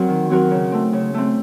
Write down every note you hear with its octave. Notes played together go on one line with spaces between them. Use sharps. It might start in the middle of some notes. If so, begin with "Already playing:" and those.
Already playing: F#3 C4 F#4 A#4
D#3
F#3 C4 F#4 A#4
C#3
A3 C4
C#3
A3 C4